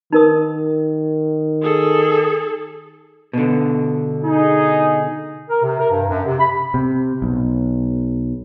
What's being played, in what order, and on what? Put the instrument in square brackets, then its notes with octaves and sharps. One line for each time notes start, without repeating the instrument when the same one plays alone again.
[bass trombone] D#3 [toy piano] D#4 A#4 D#6
[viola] G#4 A4
[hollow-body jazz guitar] B2 D3
[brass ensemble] D#4 G#4
[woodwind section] A#4
C3
A#4
G2
F#2
C3
B5
[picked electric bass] C3
B1